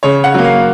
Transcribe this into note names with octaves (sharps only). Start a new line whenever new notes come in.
C#3 C#5
F#5
F#3 A#3
F5